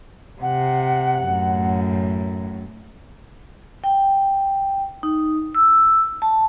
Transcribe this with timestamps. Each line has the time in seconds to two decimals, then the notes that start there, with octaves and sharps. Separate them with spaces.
0.42 C3 F#5
1.24 F#2 A2
3.84 G5
5.03 D#4
5.55 E6
6.22 A5